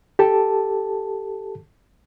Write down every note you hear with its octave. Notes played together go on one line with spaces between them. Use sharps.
G4 A4 A5